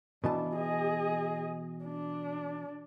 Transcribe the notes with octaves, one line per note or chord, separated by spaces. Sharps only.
B2 E3 D4 A5
G#4 D#5
D4